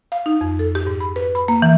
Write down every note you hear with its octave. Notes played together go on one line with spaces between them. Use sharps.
F5
D#4
F2
A4
G4
G#2
B5
B4
B5
A#3
E3